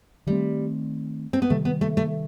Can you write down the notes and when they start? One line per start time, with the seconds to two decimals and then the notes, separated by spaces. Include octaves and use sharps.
0.27 D#3 G3 A3 C4
1.33 C4
1.42 B3
1.50 C3 D#3 G3 A3
1.65 B3
1.81 A3
1.97 A3